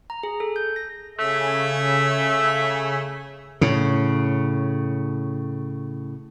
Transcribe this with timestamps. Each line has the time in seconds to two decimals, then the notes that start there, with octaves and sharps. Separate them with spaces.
0.10 A#5
0.23 G#4
0.40 A4
0.56 G6
0.76 A#6
1.19 C#3 A3 E5 G#5
3.61 A2 C#3